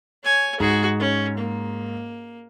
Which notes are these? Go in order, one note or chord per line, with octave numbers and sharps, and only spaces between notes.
C#5 G#5
G#2 F#4 G#4
C#4
A#3